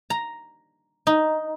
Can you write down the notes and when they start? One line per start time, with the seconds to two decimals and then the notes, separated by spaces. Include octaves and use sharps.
0.10 A#5
1.07 D#4